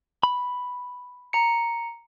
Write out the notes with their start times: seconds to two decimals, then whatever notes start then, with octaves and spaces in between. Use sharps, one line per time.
0.23 B5
1.33 A#5 C#7